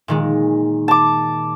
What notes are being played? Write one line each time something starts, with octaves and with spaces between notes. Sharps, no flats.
A#2 D#3 G#3
A5 D6